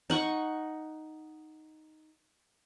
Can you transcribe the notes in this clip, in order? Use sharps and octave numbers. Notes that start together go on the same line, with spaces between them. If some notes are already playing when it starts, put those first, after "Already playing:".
D#4 F#5 C#6